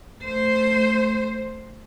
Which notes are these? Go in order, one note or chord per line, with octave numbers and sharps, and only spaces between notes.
A3 C5